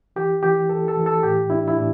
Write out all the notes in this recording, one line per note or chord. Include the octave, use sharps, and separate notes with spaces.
E3 G4
E3 G4
E3 A4
A4
E3
A4
A2 G4
D4 E4
E4
A2 D4